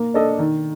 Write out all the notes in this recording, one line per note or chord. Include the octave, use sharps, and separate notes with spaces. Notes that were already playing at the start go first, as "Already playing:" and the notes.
Already playing: A#3
D4 A4 D#5
D#3